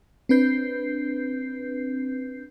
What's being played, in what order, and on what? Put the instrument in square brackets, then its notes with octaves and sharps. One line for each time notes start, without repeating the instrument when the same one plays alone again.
[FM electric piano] C4 D4 B4 G6 C7